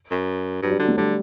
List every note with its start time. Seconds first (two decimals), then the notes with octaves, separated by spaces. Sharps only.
0.11 F#2
0.62 G2 F#3
0.71 G3
0.79 D3 F#3
0.88 A3
0.97 D3 G3